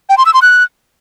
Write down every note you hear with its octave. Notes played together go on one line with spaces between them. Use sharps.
G5
C6
E6
C6
F#6